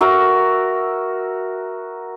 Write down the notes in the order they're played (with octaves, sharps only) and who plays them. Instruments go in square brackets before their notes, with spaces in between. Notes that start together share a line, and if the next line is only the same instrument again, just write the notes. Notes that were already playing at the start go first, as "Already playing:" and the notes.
[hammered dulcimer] F#4 A#4 E5